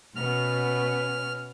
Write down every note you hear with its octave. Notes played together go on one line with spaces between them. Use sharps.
B2 B3 C#4 F6